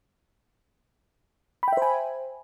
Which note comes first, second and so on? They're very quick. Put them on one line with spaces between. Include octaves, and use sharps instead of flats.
B5 G5 E5 C5 G#5